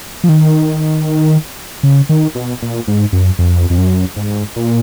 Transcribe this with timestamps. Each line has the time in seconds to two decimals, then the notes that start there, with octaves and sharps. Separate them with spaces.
0.24 F3
0.29 D#3
1.83 C#3
2.09 D#3
2.35 B2
2.62 A#2
2.88 G#2
3.13 F#2
3.39 F2
3.70 F2
3.78 F#2
4.16 G#2
4.56 A#2